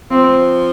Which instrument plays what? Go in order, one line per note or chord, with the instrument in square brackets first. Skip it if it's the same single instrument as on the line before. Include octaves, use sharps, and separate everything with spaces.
[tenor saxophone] F3 [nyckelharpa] C4